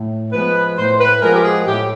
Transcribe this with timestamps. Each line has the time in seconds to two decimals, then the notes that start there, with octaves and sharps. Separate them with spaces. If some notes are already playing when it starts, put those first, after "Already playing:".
Already playing: A2
0.32 F3 G#3 B3 B4
0.77 A2 C5
0.99 B4
1.22 F3 G#3 B3 A#4
1.35 G4
1.43 G#4
1.66 A2 G4